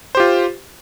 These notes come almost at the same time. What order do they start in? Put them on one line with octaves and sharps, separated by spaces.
C5 G4 F4